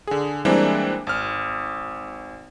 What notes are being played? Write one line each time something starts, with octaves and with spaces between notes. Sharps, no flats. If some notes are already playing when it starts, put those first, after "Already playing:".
D3 G#4
E3 G3 G#3 A#3 C4 D4
G#1 F6